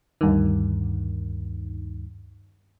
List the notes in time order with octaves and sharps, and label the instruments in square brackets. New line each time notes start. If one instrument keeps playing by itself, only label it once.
[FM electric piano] D2 G2 D#3